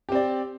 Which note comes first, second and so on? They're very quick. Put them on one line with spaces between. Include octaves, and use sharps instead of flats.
G4 C4 D5